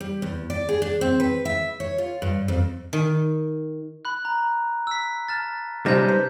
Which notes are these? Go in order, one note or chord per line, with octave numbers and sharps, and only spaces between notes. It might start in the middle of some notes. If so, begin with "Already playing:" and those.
G3
E2
D5
G#4
D4
C4
B4
E5
C#5
F4
G2
F2
D#3
B5 F#6
A#5
E6 B6
A5 F6 A6
C3 G3 C4 C#4 D#4 A5 G6
B4 C5